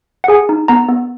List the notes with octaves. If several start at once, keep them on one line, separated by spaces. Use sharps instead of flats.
F#5
G#4 G#5
D#4
B3 A#5
B3